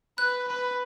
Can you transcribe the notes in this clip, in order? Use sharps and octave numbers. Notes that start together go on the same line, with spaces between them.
B4 F#6
B4